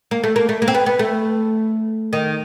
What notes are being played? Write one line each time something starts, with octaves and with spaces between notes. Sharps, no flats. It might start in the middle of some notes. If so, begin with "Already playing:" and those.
A#3
A3
A#3
A3
A#3
C4
B3
B3
A3
D#3